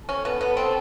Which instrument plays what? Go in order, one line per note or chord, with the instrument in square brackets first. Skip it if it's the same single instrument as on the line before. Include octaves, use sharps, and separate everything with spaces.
[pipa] C#4 [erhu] A4
[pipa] B3
B3
C4